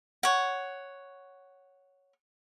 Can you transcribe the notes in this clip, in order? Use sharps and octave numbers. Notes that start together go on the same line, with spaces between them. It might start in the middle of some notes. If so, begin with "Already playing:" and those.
C#5 F#5